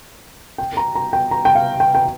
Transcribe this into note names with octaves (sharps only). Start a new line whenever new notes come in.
G5
A#5
A#5
G5
A#5
G5
F5
G5
G5